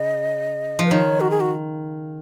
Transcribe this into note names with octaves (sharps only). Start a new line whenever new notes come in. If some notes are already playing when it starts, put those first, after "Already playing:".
Already playing: C#3 D#5
F3
B4
D#3 C#5
F#4
G#4
F#4